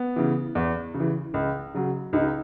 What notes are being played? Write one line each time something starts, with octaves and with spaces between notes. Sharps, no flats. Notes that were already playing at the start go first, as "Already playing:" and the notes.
Already playing: B3
C#3 E3
E2
C#3
E3
C#2
C#3 F#3
C#2 D#4